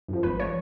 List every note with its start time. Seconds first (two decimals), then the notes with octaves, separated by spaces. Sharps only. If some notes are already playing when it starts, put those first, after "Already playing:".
0.08 F#2 F3
0.23 G#1 B4
0.39 F3 C#5